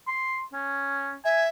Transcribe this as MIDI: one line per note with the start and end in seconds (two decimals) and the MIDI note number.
0.08 0.39 84
0.54 1.15 61
1.25 1.48 76
1.25 1.43 80